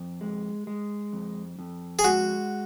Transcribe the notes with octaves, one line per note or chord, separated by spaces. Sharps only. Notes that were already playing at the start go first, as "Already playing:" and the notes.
Already playing: F2
G#3
G#3
F2
F2
G#4
G#3 F#4